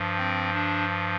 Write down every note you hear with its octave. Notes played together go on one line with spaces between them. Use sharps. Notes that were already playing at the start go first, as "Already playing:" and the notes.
Already playing: G2 F3
C4
D4